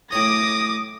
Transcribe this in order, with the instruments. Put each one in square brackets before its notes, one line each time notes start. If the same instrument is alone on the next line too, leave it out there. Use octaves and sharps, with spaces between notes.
[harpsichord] A2 C#5 [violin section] D6 A#6 [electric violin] D#6